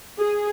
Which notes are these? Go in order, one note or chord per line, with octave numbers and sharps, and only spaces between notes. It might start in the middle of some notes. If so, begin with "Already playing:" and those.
G#4